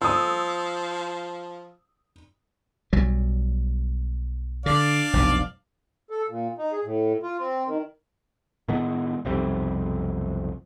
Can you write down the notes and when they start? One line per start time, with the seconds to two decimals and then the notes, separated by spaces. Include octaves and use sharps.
0.02 F3 D#6 E6
2.93 B1 F#3 G3
4.66 D3 D4 D5 F5
5.13 F1 B1 B2
6.10 A4
6.29 A#2
6.58 D#4
6.72 G#4
6.85 A2
7.23 F4
7.40 C4
7.67 D#3
8.68 A2 D#3 G#3 B3
9.25 B1 F2 C3 G3